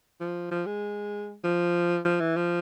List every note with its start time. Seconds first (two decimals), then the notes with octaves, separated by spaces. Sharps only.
0.21 F3
0.51 F3
0.66 G#3
1.44 F3
2.05 F3
2.20 E3
2.36 F3